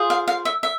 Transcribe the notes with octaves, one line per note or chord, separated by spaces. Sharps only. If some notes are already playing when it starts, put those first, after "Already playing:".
Already playing: F4 G#4 C5
F5
F5
E5
E5